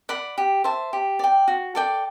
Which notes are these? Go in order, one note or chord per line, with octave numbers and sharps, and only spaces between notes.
D5 F#5 B5
G4
C5 E5 A5
G4
D5 G5
F#4
A4 D5 G5